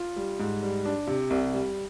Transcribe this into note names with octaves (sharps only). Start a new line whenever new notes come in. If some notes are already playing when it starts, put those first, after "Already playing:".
Already playing: F4
G3
G#2
G3
D4
C3
C2
G3